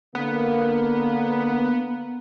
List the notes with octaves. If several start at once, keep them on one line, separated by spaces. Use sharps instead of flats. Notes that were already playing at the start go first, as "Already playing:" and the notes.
D3 A#3 B3